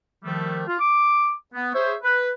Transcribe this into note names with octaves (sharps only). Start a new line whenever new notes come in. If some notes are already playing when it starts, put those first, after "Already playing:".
D#3 F3 G3 A3
F4
D6
B3
G#4 C5 C#5 E5
B4